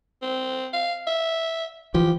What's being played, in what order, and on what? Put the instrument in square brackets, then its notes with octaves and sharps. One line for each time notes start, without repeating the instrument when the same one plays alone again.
[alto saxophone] C4
F5
E5
[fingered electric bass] E3 F3 [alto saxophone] G4